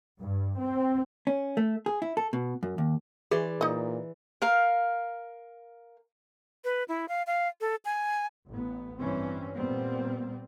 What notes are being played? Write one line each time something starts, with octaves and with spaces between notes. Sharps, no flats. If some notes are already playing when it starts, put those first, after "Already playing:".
G2
C4
C#4
A3
G#4
E4
A4
B2
F#2
D#2
E3 G#4 D5 C6
A#2 D#4 D#5
A#4 F5
B4
E4
F5
F5
A4
G#5
A1 B3
G2 E3 C4 C#4
A#2 G3 B3 C4